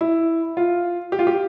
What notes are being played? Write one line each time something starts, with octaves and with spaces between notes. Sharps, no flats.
E4
F4
G4
F4
G4